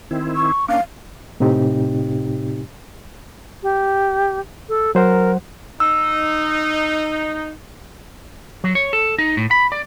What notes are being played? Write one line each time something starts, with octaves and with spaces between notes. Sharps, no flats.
D#3 C4 E4
C#6
A#3 C#4 D4 F5
A2 C3 C4 D#4 G4
G4
A4
F#3 A#4 C5 F#5
D#4 E6
F#3
C#5
A4
D#4
A2
B5
D5